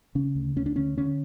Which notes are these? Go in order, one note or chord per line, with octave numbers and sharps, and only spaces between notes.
C#3 C#4
D2
D2 C#4
D4
D3 C#4
D3 C#4